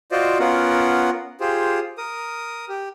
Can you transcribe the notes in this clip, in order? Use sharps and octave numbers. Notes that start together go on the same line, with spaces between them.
F4 F#4 C5 D5 D#5
B3 C#4 F4 A#4 F#5
F4 G4 G#4 C5
A#4 D#6
G4